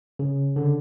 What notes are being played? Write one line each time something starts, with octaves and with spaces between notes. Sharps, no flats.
C#3
D3